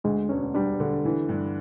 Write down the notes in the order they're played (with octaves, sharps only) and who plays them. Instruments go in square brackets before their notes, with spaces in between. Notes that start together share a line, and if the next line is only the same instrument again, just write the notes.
[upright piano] D2 [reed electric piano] G#3
[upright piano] E1 [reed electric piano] C#4
[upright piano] G3 [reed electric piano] D4
[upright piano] D3
E3
G2